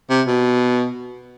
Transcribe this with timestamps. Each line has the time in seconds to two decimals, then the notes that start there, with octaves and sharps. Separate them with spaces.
0.10 C3
0.27 B2